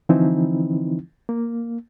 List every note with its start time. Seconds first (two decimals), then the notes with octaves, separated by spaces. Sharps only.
0.09 D3 E3 F3 C4 D#4 E4
1.29 A#3